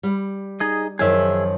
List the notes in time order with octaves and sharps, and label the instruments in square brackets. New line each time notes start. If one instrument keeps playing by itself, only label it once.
[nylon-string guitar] G3
[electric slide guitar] D#4 G#4 D#5
[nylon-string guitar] F#2 D#3 F3 [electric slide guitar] G#4 E5